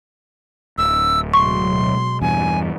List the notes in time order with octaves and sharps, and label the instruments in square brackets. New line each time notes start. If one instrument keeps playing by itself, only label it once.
[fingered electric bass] D1 [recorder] E6
[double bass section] B2 F#3 G#3 [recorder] C6 [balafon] C#6
[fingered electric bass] E2 G2 [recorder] G#5